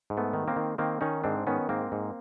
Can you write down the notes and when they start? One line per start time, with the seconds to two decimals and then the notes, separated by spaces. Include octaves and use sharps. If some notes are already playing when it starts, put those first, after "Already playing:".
0.10 G#2
0.17 A3 B3
0.33 D#3
0.48 A#3 C4
0.56 D#3
0.78 D#3 A#3 C4
1.01 D#3 C#4 D#4
1.24 G#2 C4 D4
1.47 D#3 B3 C#4
1.69 G#2 A#3 C4
1.92 G#2